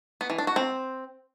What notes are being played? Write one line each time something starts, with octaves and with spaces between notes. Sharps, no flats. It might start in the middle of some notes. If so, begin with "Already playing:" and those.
B3
E3
D4
F#4
C4